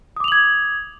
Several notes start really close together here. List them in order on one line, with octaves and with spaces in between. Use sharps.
D#6 D6 F7 F#7 G#6